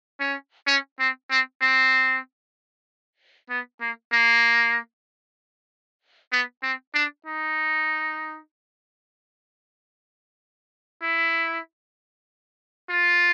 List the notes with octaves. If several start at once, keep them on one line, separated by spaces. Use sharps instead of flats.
C#4
C#4
C4
C4
C4
B3
A#3
A#3
B3
C4
D4
D#4
E4
F4